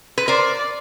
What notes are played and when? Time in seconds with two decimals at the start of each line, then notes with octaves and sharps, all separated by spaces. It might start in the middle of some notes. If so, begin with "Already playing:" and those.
0.18 B4
0.28 A#4 C5 D5